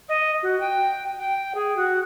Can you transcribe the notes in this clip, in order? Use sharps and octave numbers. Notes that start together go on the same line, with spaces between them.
D#5
F#4
G5
G5
G#4
F#4